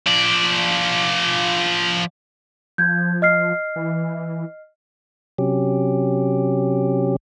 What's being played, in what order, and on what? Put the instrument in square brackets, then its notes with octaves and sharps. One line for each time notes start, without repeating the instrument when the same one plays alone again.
[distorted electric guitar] F3 D5
[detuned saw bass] F3 [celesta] G6 G#6
[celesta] D#5 F6 C7
[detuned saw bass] E3
[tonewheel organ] C3 F#3 C#4 G4